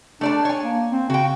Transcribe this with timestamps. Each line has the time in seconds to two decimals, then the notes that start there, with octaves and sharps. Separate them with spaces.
0.21 A3 D4 D5 A5
0.45 C#5 G#5
0.63 A#3
0.92 C4
1.10 C#3 F#4 G5